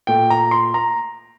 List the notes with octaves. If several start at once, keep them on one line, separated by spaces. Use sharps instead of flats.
A#2 A3 G5
A#5
C6
A#5